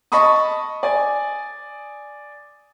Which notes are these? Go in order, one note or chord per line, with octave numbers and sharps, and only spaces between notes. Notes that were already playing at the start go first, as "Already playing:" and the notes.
D#5 A5 B5 C#6 D#6
D5 G#5